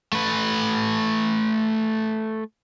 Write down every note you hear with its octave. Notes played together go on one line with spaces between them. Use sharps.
A3 B4